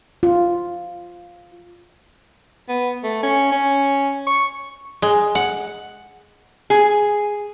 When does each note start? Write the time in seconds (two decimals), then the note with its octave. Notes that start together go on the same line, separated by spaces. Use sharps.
0.23 F4
2.69 B3
3.04 A3
3.23 C#4
3.52 C#4
4.27 C#6
5.02 G#3
5.35 F#5
6.70 G#4